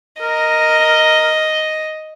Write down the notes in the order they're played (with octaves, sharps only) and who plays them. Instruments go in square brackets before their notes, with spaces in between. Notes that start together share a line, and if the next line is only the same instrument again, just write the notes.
[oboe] A#4 [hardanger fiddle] D#5